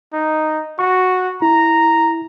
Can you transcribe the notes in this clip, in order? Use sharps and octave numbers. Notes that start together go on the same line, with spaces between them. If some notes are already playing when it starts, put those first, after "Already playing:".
D#4
F#4 C#6
E4 A#5